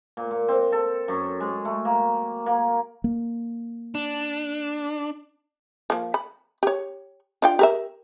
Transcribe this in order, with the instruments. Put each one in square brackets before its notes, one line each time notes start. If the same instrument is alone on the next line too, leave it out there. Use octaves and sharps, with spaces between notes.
[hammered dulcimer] A#2
A#2
C4
A4
F#2
G#3
A3
A#3
A#3
[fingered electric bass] A#3
[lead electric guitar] D4
[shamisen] F3 A#3
B5
G4 C#5
D4 F4 G5
G4 A#4 E5